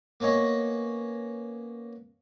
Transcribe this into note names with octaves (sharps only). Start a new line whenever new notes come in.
A#3 B3 C#4 C#5 D#5